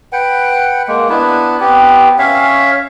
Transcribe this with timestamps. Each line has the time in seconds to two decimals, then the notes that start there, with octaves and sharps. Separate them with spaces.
0.13 B4 F#5 G5
0.88 G#3 A#3
1.10 B3 D4 E4 B4
1.60 B3 C4 G4 B4
2.18 C#4 C#5 E5 F5